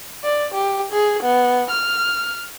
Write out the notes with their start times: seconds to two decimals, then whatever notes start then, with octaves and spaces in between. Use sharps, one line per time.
0.24 D5
0.54 G4
0.92 G#4
1.23 B3
1.70 F6